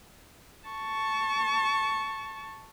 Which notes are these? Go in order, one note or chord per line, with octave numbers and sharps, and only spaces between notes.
A5 C#6